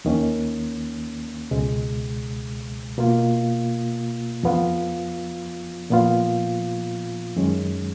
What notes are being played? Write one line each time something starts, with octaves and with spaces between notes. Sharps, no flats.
D#2 D#3 A#3 C#4
C#2 B2 G#3
B2 A#3 F4
F2 F3 B3 F4
A#2 F3 B3 F4
F#2 D#3 G#3 C#4